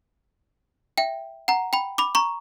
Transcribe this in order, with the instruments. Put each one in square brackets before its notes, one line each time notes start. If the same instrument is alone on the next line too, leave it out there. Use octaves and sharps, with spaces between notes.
[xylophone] E5 G5
F#5 A#5
G5 B5
B5 D6
A#5 C#6